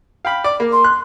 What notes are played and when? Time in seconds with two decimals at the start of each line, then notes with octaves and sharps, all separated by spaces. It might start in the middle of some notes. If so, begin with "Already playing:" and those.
0.25 F5 G5 B5
0.44 D5
0.60 A#3
0.72 C6
0.84 F#6